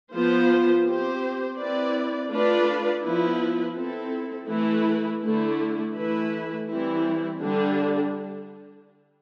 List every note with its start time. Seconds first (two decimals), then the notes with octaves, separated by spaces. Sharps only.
0.13 F3 B3 F4 C5
0.86 C4 G4 C5
1.59 C4 E4 B4 D5
2.32 A3 D4 F4 B4 D5
3.04 F3 B3 E4 B4
3.76 C4 E4 A4
4.49 E3 A3 E4 B4
5.22 D3 A3 E4
5.95 E3 A3 E4 B4
6.68 E3 G3 C4 E4
7.40 D3 G3 D4